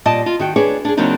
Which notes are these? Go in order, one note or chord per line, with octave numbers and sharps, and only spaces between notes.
A#2 G3 D5 D#5 A5
F4
D#3 F#4 G5
D4 G#4 B4 C#5 D5
D4 G#4
C#3 F#3 A#3 C4 D4 D#4